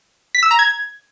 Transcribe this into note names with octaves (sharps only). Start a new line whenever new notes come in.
B6
E6
A#5
G#6